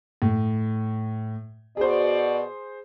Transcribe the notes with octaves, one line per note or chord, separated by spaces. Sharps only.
A2
B2 F#4 G#4 C5 D5